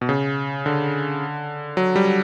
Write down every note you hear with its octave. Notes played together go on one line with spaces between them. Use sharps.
B2
C#3
D3
F#3
G3